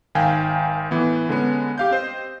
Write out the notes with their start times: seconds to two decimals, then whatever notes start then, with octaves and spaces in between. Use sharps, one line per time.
0.15 G#1 D#3 F5 G5 G#5
0.91 A2 E3 B3
1.29 D3 G#3 B3 C#4
1.78 G4 F5 G6
1.91 C4 C5 D#5